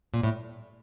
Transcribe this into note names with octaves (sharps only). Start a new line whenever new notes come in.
A#2
A2